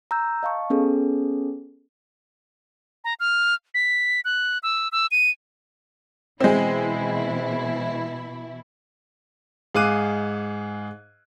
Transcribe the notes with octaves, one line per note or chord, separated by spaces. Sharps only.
A#5 E6 G6
D#5 F5 A5 C#6
B3 C#4 G#4 A4
A#5
F6
B6
F#6
E6
E6
D#7
B2 E3 G#3 C4 E4
G#2 G#4 F5 D6 F#6 D#7